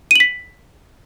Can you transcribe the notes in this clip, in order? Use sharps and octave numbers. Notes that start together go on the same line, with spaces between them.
B6 D#7 F#7